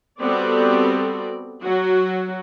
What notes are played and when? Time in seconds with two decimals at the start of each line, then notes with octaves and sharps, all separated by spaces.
0.20 G3 B3 C4 F#4 A4 D5
1.62 F#3 F#4